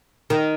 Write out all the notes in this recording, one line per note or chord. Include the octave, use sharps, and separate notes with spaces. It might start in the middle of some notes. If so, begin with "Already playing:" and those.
D#3